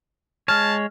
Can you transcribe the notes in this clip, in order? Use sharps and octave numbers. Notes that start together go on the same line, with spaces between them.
G#3 C#5 A5 F6